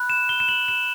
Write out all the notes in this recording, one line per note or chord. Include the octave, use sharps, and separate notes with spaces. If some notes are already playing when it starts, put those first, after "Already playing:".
Already playing: B5 F#6
E7
G7
E7
F#7
E7